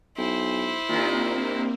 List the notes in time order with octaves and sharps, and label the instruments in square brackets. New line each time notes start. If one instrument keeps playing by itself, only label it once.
[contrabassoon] B1 [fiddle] E4 C5
[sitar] G2 D#3 [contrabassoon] A#2 [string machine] A#3 C4